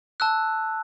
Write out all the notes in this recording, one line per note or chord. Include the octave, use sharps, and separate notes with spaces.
A5 E6 F#6